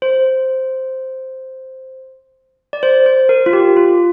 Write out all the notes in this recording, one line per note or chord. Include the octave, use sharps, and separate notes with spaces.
C5
D5
C5
C5
A#4
F4
G4
F4